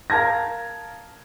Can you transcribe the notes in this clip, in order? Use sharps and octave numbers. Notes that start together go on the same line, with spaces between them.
A#4 F5 A5 G#6 A#6